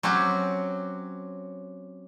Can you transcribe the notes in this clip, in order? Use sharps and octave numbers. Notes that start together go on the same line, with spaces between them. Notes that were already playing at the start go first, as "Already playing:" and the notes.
F#3 C4 C#4 F#4 G4